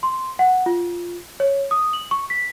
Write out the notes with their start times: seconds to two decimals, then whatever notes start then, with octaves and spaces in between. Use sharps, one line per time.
0.03 C6
0.39 F#5
0.66 F4
1.40 C#5
1.71 D#6
1.93 F#7
2.11 C#6
2.30 B6